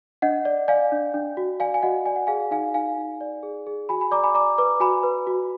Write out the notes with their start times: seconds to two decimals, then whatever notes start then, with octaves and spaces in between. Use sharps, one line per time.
0.22 D4 D#5 F#5
0.45 D5
0.68 D5 F5 G#5
0.92 D4
1.14 D4
1.37 F#4
1.60 D5 F5 G#5
1.74 G#5
1.83 F#4 D#5 F#5
2.06 D5 G#5
2.16 F#5
2.27 G#4 F5 G#5
2.51 D#4 F5 G#5
2.74 D#4 F5 G#5
2.97 D#4
3.21 D5
3.43 G#4
3.67 G#4
3.89 F#4 G#5 B5
4.01 G#5 B5
4.11 D5 A#5 D6
4.24 G#5 B5
4.34 D5 A#5 D6
4.58 B4 A#5 D6
4.80 F#4 G#5 B5
5.03 B4
5.27 F#4